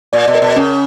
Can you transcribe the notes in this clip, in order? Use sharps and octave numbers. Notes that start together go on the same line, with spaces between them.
A#2 D5
B2
A#4
B2
C#3 C#4